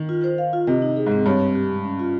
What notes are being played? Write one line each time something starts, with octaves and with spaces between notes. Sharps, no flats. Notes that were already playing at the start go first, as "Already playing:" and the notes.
Already playing: D#3
F4
C5
F5
F4
C3 D#5
D#4
G#4
G#2
C4
G2 C#5
C4
G4
G#3
C#4
F4